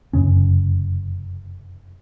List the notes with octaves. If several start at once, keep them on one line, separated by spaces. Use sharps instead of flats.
F1 F#2 C#3 C#4